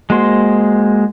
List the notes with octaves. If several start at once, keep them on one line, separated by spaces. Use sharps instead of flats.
G#3 A#3 F#4 C5 C6